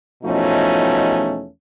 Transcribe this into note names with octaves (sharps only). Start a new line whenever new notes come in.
E2 B2 F3 A3 C#4 D#4